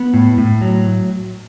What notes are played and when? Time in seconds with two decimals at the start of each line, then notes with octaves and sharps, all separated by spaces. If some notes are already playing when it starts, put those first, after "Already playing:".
Already playing: B3
0.14 A2
0.38 A2
0.61 F#3